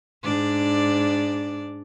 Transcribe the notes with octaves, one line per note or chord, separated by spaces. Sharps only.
G#2 D4 D5